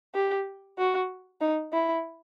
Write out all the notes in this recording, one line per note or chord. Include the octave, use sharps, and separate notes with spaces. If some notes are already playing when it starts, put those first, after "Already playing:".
G4
F#4
D#4
E4